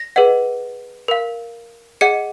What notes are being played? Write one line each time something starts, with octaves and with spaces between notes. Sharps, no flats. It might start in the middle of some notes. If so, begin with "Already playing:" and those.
Already playing: A#6
G#4 B4 D#5 F#5
A#4 F5
G#4 D#5 F#5 C#7